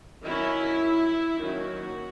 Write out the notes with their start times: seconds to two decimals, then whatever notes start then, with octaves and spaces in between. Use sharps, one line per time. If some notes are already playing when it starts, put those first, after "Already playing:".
0.25 D#3 F#3 C#4 E4
1.38 D#3 F#3 A#3 C#4 F#4